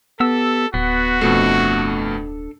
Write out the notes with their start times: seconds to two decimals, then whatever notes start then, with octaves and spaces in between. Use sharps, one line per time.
0.20 B3 G4 A4 E6
0.74 D1 B3 F#4
1.21 F2 B2 A3 D4 A4